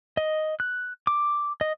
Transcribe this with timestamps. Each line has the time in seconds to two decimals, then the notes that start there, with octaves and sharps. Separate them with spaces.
0.17 D#5
0.60 F#6
1.07 D6
1.61 D#5